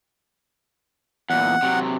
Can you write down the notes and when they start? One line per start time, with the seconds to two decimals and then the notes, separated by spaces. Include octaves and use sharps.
1.30 E2 A#2 F#5
1.63 C3 F#3